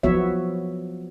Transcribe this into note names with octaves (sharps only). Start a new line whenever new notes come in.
F3 F#3 B3 F#4 C#5 E5